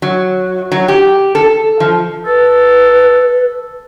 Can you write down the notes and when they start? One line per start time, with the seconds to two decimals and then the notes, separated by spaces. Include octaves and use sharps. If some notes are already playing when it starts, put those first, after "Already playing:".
0.02 F#3
0.72 F#3
0.88 G4
1.35 A4
1.80 F3
2.26 A4 B4